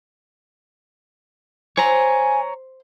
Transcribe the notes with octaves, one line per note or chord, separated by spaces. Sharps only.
C5 C#5 G#5 A#5